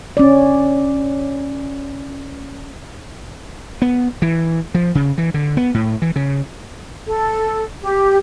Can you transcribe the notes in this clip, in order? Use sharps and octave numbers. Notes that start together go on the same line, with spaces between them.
C#4 D5
B3
E3
F3
C#3
E3
D3
B3
A2
E3
C#3
A4
G4